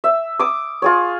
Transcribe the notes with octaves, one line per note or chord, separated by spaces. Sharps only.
E5
D6 D#6
F4 G#4 C#5